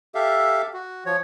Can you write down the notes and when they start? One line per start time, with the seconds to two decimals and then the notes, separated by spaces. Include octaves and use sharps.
0.15 G4 A4 E5 F5
0.73 F#4
1.06 F3 C#5